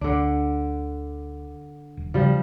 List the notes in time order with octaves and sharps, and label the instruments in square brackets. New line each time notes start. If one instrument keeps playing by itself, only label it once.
[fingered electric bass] D2 [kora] D3 D4
[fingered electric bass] D#1
[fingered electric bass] C#3 [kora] F3 G3